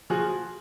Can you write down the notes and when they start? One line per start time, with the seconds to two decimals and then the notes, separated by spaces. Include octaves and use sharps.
0.10 F3 F#4 G#4